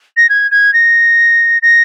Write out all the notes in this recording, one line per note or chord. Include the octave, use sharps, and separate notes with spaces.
A#6
G#6
G#6
A#6
A#6